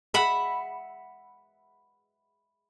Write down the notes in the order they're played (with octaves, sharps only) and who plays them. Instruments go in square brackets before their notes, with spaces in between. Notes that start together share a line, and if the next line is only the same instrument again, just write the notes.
[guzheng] E5 F#5 B5